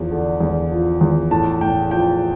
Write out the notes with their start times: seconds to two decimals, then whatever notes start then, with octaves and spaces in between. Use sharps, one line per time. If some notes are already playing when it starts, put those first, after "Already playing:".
Already playing: E2 F3
0.11 D3
0.41 E2
0.71 F3
1.01 E2
1.31 A2 A5
1.61 A2 G5
1.91 F3 G5